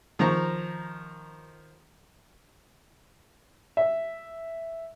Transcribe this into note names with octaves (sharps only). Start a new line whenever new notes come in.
D#3 F3 A#5 C#6
E5